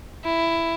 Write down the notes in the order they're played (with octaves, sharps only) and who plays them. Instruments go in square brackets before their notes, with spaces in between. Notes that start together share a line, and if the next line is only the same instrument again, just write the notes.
[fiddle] E4